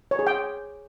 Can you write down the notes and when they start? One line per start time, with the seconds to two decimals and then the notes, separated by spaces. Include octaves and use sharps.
0.11 C#5
0.19 G#4
0.27 G5